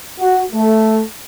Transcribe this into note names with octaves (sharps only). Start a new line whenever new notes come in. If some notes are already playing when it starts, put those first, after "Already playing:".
F#4
A3